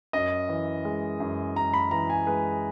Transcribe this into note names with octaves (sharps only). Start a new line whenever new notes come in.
F#2 D#5
E3
G#3
F#2
F#2 A#5
B5
E3 A#5
G#5
G#3 B4